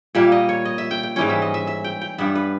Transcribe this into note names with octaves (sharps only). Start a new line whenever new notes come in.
A#2 G3 A#3 E5
D#5
C#5
D#5
E5
G5
G5
G#2 E3 G3 C#4 G5
E5
D#5
E5
E5
G5
G5
G2 G3 B3 E5
B4